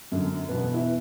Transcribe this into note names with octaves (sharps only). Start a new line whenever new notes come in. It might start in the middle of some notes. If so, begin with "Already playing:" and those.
F#2 D3
E2 B2 B3
B3
E4